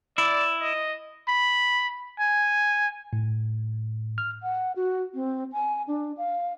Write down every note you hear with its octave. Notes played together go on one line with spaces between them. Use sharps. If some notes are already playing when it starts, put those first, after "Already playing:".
E4 D5
D#5
B5
G#5
A2
F6
F#5
F#4
C4
G#5
D4
F5